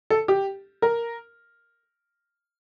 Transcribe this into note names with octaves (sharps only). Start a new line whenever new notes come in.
A4
G4
A#4